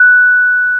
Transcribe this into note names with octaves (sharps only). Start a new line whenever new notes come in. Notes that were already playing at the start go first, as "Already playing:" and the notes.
Already playing: F#6